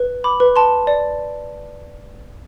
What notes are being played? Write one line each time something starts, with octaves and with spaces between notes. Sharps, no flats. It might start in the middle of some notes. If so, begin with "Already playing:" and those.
Already playing: B4
B5 D6
B4
A5 C6
D5